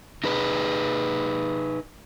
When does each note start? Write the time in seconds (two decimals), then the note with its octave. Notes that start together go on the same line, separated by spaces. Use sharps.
0.24 D#4 G#4 B4